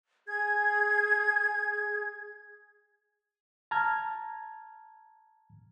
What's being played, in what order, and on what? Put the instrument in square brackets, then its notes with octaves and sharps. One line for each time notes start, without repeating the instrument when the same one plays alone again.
[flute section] G#4 G#6
[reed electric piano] A5 A#5 F6 G#6